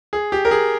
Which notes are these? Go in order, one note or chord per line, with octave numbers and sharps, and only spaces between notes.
G#4
G4
A#4
G#4